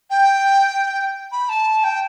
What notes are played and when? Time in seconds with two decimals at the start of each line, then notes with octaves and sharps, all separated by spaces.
0.10 G5
1.32 B5
1.49 A5
1.84 G5